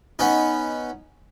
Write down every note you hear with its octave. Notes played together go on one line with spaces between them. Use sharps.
B3 C#4 D#4